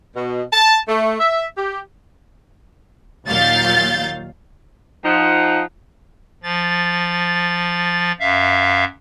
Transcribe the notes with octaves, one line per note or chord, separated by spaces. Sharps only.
B2
A5
A3
E5
G4
D#2 A#2 F#3 F5 G6 A6
F3 D#4 F#5
F3 A6
F#2 E5 F5